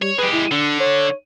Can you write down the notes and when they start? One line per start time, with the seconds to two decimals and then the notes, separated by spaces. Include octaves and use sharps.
0.02 G3 C#5
0.18 G#3 G4 B4
0.33 E4
0.51 D3 D4
0.80 C#5